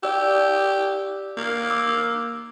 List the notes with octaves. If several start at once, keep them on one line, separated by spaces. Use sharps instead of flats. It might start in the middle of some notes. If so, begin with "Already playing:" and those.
G4 D5 E6
A#3
D6 E6